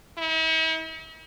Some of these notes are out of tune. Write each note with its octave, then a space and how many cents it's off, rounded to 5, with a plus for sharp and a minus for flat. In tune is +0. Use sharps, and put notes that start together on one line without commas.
E4 -45